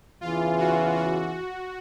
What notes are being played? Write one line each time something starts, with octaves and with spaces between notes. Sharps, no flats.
E2 C#3 E3 F4
F#4
F#4